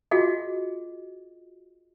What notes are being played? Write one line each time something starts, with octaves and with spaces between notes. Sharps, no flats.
F4 F#4 G#4 D#5